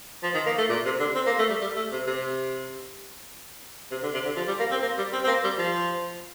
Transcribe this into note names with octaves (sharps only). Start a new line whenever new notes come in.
F3
D#3
A#3
A3
A#2
C3
D3
C4
A#3
A3
G3
G3
A3
C3
C3
C3
D3
C3
D3
F3
G3
A#3
C4
A#3
G3
C4
C4
A#3
G3
F3